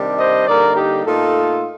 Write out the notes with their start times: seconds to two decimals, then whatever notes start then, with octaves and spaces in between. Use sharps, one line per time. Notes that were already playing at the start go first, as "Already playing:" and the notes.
Already playing: C3 D#3 G3 D4
0.17 C5 D#5
0.47 D3 G3 A#3 D#4 A#4 D5
0.76 D#4 G4
1.06 A#2 A3 D#4 F4 A4